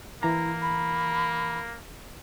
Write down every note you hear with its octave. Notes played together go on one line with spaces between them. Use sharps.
E3 A#3 E4 A#5
B5